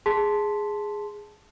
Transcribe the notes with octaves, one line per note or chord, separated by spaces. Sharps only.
G#4 A5 C6 B6